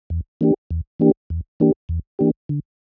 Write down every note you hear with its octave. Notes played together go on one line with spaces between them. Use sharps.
E2
E3 A#3 D4 G4
E2
E3 A#3 D4 G4
E2
E3 A#3 D4 G4
E2
E3 A#3 D4 G4
D3